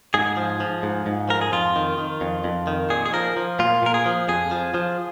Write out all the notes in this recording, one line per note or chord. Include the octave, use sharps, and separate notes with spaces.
G#2 G#4
F3
F3
G#2
G#2
F3 A#4
G#4
F2 F4
D#3
D#3
F2
F2
D#3
A#2 G#4
G#4
F3 A#4
F3
A#2 F4
A#2 A#4
G#4
F3
F2 G#4
F3
F3